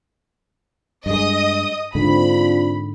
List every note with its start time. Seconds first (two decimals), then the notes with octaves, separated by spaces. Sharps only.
1.06 G2 G#3 D#5 D#6
1.95 G#2 D3 C4 D4 F4 B5